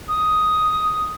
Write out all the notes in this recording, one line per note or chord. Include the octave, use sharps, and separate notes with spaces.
D#6